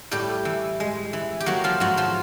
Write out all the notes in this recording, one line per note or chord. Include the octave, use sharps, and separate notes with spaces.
A2 G3 G4
E3
G#3
E3
G4
F#3 A#3 F#4
F3 F4
G#2 F#3 F#4
F3 F4